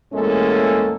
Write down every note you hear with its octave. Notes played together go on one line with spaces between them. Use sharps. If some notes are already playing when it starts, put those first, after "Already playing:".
E2 A2 G#3 A#3 C#4 A4